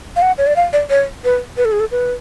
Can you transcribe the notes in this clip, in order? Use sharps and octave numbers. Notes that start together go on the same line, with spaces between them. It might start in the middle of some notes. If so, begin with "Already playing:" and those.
F5
F#5
C#5
D5
F5
D5
C#5
B4
B4
A4
G#4
A4
B4